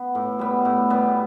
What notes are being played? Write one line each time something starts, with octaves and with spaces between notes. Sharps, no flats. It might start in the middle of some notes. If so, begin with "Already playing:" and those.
Already playing: B3
A2
G3 B3
A2
G3 B3